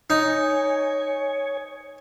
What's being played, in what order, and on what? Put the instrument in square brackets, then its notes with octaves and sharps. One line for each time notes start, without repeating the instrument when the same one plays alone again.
[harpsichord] D#4 [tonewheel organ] C#5 G#5